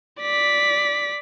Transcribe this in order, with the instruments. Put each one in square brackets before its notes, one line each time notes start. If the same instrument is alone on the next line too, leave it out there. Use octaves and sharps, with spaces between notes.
[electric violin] D5 B6